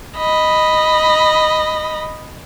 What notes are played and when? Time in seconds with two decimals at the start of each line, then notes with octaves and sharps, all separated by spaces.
0.17 D#5 B5